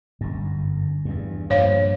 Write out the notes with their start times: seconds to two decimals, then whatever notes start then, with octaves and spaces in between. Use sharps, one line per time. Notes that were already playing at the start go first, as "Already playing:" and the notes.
0.21 G1 F#2
1.05 E2 G2
1.50 G2 A#2 F3 C5 C#5 F5